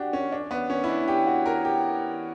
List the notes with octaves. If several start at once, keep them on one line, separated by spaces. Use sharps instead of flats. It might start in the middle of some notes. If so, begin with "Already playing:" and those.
Already playing: D4 F#4 G4
C#4
D4
B3
C#4
E4
D4
G4
F#4
A#4
G4